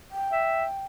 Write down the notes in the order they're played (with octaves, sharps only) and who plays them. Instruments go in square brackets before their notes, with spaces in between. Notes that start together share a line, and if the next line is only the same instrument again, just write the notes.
[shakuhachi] G5
[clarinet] E5